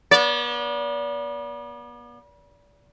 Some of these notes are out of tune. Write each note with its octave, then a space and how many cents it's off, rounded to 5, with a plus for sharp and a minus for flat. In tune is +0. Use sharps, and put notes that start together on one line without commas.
B3 -40 D5 -30